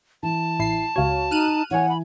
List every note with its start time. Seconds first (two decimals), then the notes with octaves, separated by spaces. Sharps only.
0.23 E3 A5
0.59 A1 E4 C7
0.96 C#2 F#4 C#5 F5
1.31 D#4 F6 F#6 D#7
1.71 E3 C#5 F#5 G#5
1.89 B5